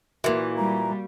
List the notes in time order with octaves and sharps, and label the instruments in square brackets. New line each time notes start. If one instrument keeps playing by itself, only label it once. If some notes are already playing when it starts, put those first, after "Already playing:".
[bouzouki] A#2 E3 [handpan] A#3 F#4 [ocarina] A#4
[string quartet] G3 [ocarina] A#5